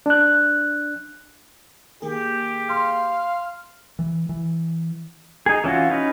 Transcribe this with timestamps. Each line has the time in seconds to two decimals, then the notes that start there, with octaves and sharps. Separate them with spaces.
0.06 D4 F#6
2.02 D#3 A#3 G4 G#4
2.70 F5 C6
3.99 E3
4.29 E3
5.46 D#4 G#4
5.64 E3 C#4 F4 F#4
5.90 C#4 D#4 B4